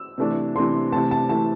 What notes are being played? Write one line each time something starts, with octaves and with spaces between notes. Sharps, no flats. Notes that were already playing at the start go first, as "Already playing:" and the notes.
Already playing: E6
C3 E3 A3 D4
C3 E3 A3 D4 C6
C3 E3 A3 A5
A5
C3 E3 A3 A5